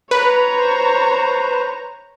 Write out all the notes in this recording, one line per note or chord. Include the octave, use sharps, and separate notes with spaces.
B4 C#5 A#5
C5